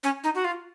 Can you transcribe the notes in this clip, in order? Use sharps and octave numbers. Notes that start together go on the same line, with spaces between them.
C#4
D#4
F#4
F4